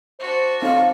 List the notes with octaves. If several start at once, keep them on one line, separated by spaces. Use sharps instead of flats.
D4 F#4 C5
C4 D#4 A4 C#5 F5